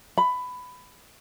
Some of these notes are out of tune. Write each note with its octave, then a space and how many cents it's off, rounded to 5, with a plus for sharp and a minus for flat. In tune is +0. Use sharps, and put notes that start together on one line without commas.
B5 +15